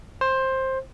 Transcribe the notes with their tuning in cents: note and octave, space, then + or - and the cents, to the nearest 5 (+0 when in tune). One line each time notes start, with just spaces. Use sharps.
C5 +15